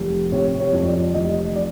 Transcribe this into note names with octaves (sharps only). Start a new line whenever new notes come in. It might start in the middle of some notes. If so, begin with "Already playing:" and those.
Already playing: F1
C3 C#5
C#5
F2
D5
F1 D#5
D5